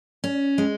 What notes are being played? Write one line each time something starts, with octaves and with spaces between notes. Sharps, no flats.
C#4
G#3